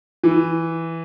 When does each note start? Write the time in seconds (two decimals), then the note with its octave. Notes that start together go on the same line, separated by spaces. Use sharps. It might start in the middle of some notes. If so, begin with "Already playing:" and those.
0.24 E3